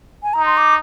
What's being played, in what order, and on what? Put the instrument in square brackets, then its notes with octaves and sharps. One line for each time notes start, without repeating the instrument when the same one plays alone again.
[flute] G#5
[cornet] D#4 [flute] A#5
[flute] C6
D6